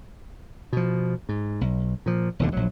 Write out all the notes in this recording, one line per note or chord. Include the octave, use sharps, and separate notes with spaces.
B2 F3
G#2
B1
A#2 F3
E1 D#2 D3
A#1 F#3